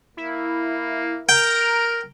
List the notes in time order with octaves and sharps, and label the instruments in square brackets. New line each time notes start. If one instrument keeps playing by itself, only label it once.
[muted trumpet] A#3 [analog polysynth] E4
[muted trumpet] A#4 [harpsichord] G5 [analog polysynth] A#5 D7